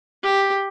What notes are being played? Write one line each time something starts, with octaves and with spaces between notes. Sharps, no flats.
G4